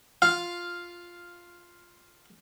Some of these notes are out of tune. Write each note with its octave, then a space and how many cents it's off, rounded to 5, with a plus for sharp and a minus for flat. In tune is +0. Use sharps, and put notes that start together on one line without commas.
F4 +0 F5 +0